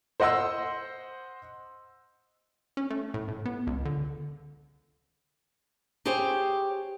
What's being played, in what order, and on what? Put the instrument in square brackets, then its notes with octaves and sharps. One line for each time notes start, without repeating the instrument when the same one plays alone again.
[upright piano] C5 D#5 F#5 C6 E6
[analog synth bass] C#4
A3
A2
A2
B3
C#2
D3
[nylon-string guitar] G4 G#4 C5 C#5 G5